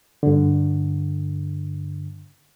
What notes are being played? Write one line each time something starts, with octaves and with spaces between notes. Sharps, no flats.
G2 D3